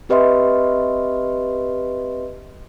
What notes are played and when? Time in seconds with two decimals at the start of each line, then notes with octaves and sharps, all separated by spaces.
0.09 C4 G4 B4 D#5 E5 C6